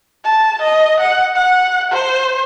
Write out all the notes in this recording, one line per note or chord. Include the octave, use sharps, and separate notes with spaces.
A5
D#5
F#5
F#5
C5